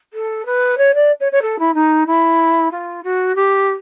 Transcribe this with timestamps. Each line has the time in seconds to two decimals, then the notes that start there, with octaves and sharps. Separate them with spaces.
0.13 A4
0.45 B4
0.77 C#5
0.94 D5
1.20 C#5
1.31 C#5
1.41 A4
1.59 E4
1.74 D#4
2.06 E4
2.71 F4
3.03 F#4
3.35 G4